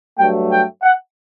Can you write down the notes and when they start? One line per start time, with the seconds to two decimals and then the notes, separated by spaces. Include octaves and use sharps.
0.18 G2 F#3 A3 G5
0.50 G5
0.82 F#5